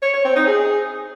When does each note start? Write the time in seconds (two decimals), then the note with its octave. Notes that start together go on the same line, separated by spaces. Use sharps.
0.02 C#5
0.14 C#5
0.25 C4
0.36 D#4
0.47 G#4